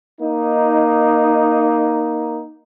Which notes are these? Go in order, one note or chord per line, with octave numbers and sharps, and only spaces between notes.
A#3 D#4